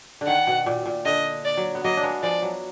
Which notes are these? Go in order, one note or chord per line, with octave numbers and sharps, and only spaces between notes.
D3
D#3 F#5
B2
A#2
A#2
D3 D#5
D5
F#3
B3
F#3 A#3 D#5
D4
G#3 B3
F3 G#3 D5
F#3